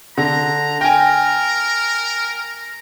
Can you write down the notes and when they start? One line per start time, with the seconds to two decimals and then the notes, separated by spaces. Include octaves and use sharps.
0.18 D3 A#5
0.81 A#4 G5 G#5